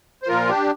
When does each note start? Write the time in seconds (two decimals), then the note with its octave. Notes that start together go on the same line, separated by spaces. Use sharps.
0.23 C5
0.28 A#2 F3 F4 A#4
0.49 D4 G4